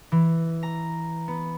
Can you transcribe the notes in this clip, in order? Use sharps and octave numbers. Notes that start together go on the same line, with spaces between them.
E3
A#5
B3